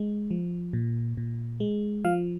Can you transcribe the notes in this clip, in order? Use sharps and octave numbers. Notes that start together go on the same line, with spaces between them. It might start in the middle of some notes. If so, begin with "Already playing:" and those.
Already playing: G#3
F3
A#2
A#2
G#3
F3 F5